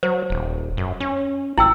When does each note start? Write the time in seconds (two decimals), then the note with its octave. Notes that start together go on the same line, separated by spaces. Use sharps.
0.03 F#3 C5
0.30 D#1
0.77 F#2
1.00 C#4
1.58 A1 E4 G5 E6